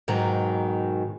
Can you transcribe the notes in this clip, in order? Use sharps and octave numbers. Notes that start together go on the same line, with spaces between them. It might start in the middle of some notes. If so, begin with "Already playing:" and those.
G#2 B2 D#3 F#3